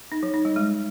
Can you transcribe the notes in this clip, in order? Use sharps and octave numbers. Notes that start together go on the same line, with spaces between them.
D#4
F#3
D#4
G3
G#3